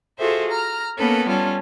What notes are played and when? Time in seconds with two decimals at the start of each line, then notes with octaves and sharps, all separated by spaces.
0.19 F4 F#4 G#4 A4 C5 E5
0.50 A#5 F6
0.98 A#3 B3 C#4 A4 B4
1.28 G3 C#4 F4 A4